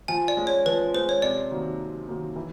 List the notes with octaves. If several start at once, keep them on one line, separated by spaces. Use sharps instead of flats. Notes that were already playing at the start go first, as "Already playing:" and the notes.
F3 G#5
D5
G#3 C#4
C#5
F3 B4
G#3 C#4 C5
C#5
C3 D5
D#3 F#3 A#3
C3
D#3 F#3 A#3
E3